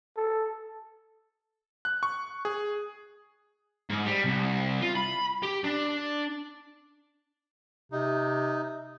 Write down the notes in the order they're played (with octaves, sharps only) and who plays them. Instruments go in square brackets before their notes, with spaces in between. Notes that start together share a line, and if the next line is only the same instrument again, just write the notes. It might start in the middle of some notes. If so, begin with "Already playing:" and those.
[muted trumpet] A4
[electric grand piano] F#6
C#6
G#4
[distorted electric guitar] G#2
G3
C2
F4
B5
G4
D4
[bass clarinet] C3 [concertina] D#4